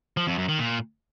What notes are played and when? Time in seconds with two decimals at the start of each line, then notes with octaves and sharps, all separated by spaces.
0.17 F3
0.28 F2
0.38 F#2
0.49 D#3
0.59 A#2